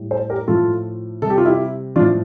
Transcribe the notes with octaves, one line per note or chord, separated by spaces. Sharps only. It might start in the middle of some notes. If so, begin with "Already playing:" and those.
Already playing: A2 G3
A4 C5
G4 A#4
A2 F3 F4 A4
C3 G3 A4
G4
F4
E4 G4
A2 F3 D4 F4